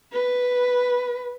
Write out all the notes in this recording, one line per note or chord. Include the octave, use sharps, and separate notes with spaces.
B4